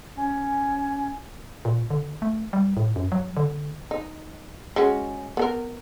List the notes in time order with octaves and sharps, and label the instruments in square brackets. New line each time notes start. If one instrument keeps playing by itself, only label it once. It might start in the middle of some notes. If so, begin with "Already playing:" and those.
[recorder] C#4
[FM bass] A#2
D3
A3
G3
A2
F#2
F#3
D3
[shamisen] D#4
G#3 C#4 F#4
B3 A4 A#4